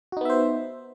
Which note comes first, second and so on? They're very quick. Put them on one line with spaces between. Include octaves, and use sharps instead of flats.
F#4 D#4 B3 E5 C5